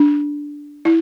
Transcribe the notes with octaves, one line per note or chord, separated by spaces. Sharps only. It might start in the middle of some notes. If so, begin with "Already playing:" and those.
Already playing: D4
E4